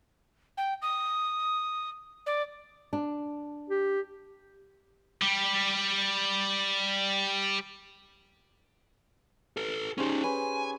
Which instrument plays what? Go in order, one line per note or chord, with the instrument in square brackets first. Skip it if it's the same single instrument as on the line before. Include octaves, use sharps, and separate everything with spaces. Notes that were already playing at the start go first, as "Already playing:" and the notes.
[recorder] G5
D#6
D5
[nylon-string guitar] D4
[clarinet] G4
[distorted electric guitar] G3 G4
[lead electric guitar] A4 B4
[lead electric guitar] C#4 D#4 [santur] G4 G#4 C5
[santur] C#4 B4 C5 [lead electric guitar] G#5